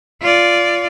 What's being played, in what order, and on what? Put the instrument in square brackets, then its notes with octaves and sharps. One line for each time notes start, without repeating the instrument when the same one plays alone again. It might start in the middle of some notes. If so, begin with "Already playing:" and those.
[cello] F4 D5